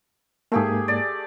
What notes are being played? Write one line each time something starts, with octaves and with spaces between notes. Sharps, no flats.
G#2 A3 A#3 G4 G#4
D5